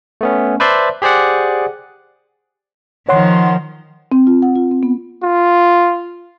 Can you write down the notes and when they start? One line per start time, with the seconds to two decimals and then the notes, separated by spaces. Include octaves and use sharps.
0.21 A3 B3 C#4
0.60 B4 C5 D5 E5 A5 C6
1.02 G4 G#4 C5 D5 F#5
3.09 D#3 F3 C#5 F#5 C6
4.12 C4
4.27 F4
4.42 F#5
4.55 F4
4.71 C4
4.83 B3
5.23 F4